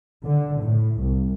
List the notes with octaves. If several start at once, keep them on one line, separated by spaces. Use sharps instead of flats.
D3
A2
C2